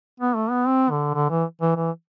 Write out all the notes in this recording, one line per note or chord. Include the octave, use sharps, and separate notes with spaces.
B3
A3
B3
C4
D3
D3
E3
E3
E3